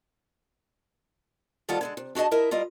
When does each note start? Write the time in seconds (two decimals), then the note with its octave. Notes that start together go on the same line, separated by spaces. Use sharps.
1.69 D2 D#3 G3 F4 A4 F#5
1.81 D3 G#3 A4
1.97 C3
2.15 D4 F#4 G#4 D#5 A5
2.31 E4 A#4 D#5 E5
2.51 G3 F4 A#4 D#5